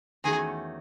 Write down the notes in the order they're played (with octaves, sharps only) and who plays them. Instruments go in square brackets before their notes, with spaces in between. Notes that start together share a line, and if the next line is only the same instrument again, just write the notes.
[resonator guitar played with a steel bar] E2 D#3 A3 C#4 F#4 [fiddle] G#4